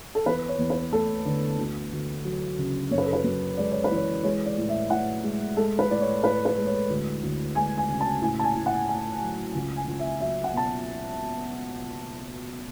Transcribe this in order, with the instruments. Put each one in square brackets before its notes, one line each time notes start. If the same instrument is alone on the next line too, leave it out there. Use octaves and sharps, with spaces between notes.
[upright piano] A4
E2 B4
C#5
E2
B4
A3 A4
D3
D2
D2
F#3
C#3
F#2 C#5
B4
A4
B4
F#2
G#3 D5
C#5
B4
E3
C#5
G#3 C#5
D5
A2
E5
A2 F#5
G#3
G#3 A4
B4
A2 D5
C#5
A2 B4
B4
G#3
C#5
D2
D2
G#3 G#5
G#5
C#3
A5
A2 G#5
A5
G#5
A2
F#5
A3 G#5
F#3
C#2
G#5
C#2
E5
F#3 E5
F#5
B2 A5